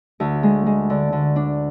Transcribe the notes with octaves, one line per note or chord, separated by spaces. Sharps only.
D2
G#3
G#3
D3
D3
D4